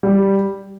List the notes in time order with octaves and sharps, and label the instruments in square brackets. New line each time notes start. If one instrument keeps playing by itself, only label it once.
[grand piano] G3